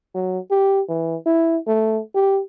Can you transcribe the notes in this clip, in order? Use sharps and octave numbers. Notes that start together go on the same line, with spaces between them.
F#3
G4
E3
E4
A3
G4